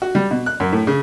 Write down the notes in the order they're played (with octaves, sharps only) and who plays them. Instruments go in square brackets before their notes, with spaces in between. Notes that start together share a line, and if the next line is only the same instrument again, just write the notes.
[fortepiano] F#4
G3
B2
F#6
F#2
A2
C#3